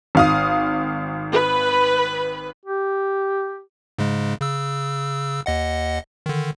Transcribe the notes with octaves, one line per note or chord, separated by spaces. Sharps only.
G#1 F5 D#6
B4
G4
G#2 C#3 G#3
C#3 E6
D#2 D#5 F#5
D3 D#3